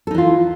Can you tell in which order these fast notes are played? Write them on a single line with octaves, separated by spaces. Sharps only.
A4 D#4 E3 F4